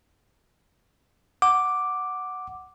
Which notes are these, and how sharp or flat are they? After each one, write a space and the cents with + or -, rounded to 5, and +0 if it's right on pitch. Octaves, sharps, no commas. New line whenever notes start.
F#5 +0 D6 +0